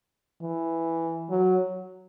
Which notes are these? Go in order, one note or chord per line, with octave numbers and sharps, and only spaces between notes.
E3
F#3